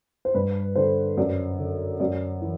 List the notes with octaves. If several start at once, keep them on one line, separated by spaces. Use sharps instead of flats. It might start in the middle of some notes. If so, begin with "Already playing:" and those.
C5
G2 B4
D3 C5
F#2 D5
D3
F#2 D5
E3